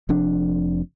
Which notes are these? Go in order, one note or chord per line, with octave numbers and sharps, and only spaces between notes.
F1 F2 D4